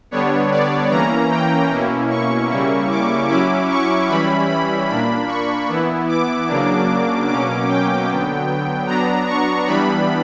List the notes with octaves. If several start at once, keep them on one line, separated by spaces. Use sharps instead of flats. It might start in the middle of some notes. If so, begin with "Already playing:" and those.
D3 G3 B3 D4 C#5
D5
E3 A#3 C#4 A#5
G5
B2 A#3 C#4 E4
C#6
C#3 G3 A#3 C#4 E4
D6
F#3 C#4 E4 D6
C#6
E3 G3 C#4 E4 B5
B5
A#2 A#3 D4 B5
C#6
E3 B3 E4
D6
C#3 F#3 A#3 D4
B2 F#3 A#3 C#4 D6
G5
D3 F#3 B3
F#3 B3 D4 A#5
C#6
E3 G3 B3 D4 B5